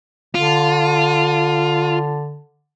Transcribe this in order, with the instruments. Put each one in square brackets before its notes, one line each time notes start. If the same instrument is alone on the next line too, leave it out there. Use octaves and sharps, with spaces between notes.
[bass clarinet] D3 [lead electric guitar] F4